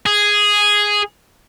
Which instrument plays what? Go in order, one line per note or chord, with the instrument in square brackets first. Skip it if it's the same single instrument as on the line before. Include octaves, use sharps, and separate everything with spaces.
[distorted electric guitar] G#4